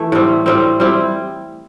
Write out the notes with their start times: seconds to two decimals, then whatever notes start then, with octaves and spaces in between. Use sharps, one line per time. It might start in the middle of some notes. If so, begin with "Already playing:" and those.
Already playing: E3 A3 E4
0.12 A2 G3 C4
0.46 A2 G3 C4
0.80 G3 C4 E4